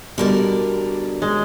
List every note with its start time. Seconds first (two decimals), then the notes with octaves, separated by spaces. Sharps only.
0.18 B2 D3 G3 A#4 D5
1.22 G#3